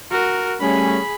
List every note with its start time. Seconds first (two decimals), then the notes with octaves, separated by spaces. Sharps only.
0.10 F#4 A#4
0.60 G3 A3 C#4 G#4 B5